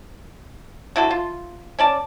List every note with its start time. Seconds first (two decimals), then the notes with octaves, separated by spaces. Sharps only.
0.96 D3 E4 F#4 A4
1.11 F4
1.79 C#4 D5 A5